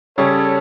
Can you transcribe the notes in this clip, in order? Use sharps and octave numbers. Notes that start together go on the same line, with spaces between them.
C#3 G3 C#4 A4 C#5